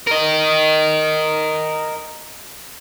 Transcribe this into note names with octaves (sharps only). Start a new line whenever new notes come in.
A#4 D#5